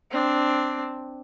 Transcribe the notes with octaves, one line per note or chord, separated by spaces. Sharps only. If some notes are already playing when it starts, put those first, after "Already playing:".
C4 D4